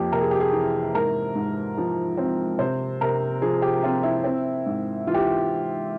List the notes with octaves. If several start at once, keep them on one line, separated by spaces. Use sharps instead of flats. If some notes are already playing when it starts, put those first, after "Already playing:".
Already playing: F2 A#3 G4
C3 A#4
G#4
G4
G#4
E3
G#2 A#4
G#2
F3
C4
C3 C5
C3 A#4
F3 G#4
G4
C4 F4
E4
C4
G#2
E3 F4
G4